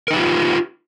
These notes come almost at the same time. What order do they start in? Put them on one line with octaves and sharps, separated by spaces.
A#4 D#4 B4 G4 F4